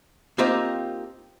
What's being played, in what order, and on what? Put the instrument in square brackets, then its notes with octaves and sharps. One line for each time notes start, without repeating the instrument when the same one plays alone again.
[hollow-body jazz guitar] A#3 C4 D#4 F4 G4 C5